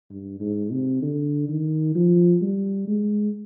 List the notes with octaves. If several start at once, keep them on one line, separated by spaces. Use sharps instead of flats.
G2
G#2
C3
D3
D#3
F3
G3
G#3